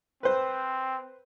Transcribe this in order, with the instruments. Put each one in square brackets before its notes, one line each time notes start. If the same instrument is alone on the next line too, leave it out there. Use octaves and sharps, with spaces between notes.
[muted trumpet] C4 [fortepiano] B4 C5